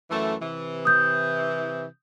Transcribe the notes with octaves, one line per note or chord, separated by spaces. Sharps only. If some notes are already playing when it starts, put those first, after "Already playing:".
F#2 E3 A3
C3 E3
D#6 G6